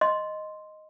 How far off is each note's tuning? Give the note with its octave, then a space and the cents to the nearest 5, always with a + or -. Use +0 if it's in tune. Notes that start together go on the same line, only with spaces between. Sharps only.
D#5 +0 C6 +0